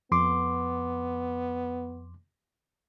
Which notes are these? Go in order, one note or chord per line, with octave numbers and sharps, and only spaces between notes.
F2 B3 C6 D6